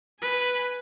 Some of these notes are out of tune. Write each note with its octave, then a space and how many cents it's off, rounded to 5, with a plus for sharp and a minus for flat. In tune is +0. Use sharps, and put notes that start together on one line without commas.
B4 +0 G#5 +0